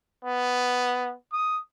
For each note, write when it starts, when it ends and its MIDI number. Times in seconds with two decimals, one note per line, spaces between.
0.25 1.15 59
1.33 1.60 87